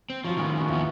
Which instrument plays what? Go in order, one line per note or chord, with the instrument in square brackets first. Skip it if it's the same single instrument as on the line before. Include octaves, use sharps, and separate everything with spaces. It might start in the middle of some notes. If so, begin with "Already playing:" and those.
[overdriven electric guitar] C4
[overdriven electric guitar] F3 [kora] F#3 F4 C#5
[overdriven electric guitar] A2 D#3 [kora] B3 C#4 F5
[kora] B3 C#4 F#4
[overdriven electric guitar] D#2 B3 [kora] E3 F3